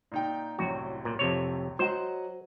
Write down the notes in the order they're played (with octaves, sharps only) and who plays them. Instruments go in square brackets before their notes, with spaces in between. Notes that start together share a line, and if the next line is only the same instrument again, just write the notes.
[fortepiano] A#2 D#4 G5
[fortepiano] C2 F#2 A2 [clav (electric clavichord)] F#4
[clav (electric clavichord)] A#2
F2 C3 C#5
[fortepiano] F#3 D#5 F#5 [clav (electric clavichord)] C5